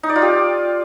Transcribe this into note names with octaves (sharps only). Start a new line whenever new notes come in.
D#4
D5
F4
G4